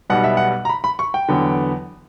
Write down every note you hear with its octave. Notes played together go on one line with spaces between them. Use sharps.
B1 B2 G3 B3 F#5
E5
F#5
A#5
B5
B5
C#6
G5
E2 D3 F#3 B3